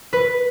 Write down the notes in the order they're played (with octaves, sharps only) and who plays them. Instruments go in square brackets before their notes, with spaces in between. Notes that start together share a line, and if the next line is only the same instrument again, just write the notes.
[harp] B4